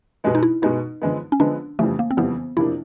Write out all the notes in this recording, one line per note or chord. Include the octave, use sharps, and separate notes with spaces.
B2 G#3 B3
D#4
E4
B2 G#3 B3 D#4
D3 F3 G#3 B3
C#4
D3 F3 G#3 B3 D4
F2 C#3 E3 G3 A3
A#3
C4
F2 C#3 E3 G3 B3
F2 C3 F3 A#3 D4 E4